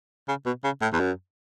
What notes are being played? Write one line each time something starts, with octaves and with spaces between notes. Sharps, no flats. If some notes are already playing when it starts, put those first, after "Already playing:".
C#3
B2
C#3
A2
E2
F#2